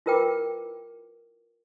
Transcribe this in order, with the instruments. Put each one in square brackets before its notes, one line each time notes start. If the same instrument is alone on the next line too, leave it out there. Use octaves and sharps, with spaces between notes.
[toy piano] E4 F4 A#4 B4 G5 D6